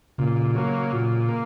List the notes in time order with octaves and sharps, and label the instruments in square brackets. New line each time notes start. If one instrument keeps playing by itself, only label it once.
[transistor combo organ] A#2 [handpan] C#3
[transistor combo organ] F#3 A#3
A#2
A#3